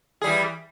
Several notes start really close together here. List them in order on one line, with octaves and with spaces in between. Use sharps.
G#4 G3 E3